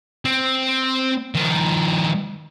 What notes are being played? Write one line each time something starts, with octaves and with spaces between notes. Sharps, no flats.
C4
D#3 F3